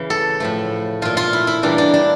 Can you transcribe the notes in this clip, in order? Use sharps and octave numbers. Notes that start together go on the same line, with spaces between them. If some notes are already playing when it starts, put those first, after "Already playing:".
Already playing: C#3 E3
A4
A2 F3 A3
A#2 A3 F4
F4
E4
E4
C#3 E3 G3 A#3 D4
D4
D4